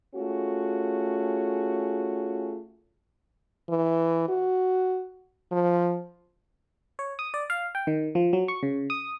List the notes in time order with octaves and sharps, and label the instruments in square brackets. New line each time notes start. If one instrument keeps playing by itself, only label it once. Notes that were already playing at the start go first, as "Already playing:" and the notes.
[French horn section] A3 C#4 F4 F#4 G#4
[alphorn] E3
F#4
F3
[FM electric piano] C#5
D#6
D5
F5
G5
D#3
F3
F#3
C#6
C#3
D#6